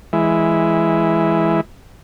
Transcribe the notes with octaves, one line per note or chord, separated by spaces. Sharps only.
E3 G#3 E4